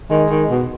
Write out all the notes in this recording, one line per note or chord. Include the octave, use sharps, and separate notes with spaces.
D#3 G#3
D#3
B2